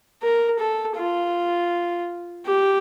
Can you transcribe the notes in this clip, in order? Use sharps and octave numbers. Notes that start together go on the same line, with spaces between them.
A#4
A4
F4
G4